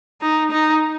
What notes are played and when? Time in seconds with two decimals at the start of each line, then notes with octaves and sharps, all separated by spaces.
0.21 D#4
0.51 D#4